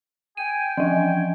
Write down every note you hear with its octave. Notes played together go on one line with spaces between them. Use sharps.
G5 G#5 D#7
E3 F3